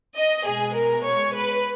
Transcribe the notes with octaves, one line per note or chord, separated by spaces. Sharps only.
D#5
B2 G#3 G#4
A#4
C#5
B4